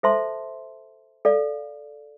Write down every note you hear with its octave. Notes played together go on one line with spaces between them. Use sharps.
A4 C5 E5 A5 C6
A4 D5 F5